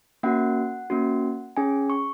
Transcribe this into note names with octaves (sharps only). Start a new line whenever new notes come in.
A#3 C#4 F#4 F#5
A#3 C#4 F#4
C#4 G#4 G#5
C#6